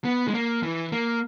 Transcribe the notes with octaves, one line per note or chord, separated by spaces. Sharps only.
B3
G#3
A#3
E3
A#3